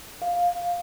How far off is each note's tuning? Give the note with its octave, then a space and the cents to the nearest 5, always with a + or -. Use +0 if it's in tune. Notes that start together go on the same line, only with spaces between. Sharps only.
F5 +15